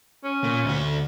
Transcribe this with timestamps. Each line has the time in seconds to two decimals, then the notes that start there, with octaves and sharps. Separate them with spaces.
0.24 C#4
0.44 A#2
0.65 D2 F#4